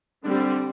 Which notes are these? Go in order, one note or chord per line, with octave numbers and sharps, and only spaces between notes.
D3 G3 C4 D4